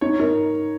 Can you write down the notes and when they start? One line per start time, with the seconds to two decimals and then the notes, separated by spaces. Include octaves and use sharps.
0.01 D#4 C#5
0.20 D#4 A#4